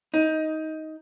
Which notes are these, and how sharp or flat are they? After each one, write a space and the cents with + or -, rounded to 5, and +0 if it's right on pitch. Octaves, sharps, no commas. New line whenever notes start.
D#4 +15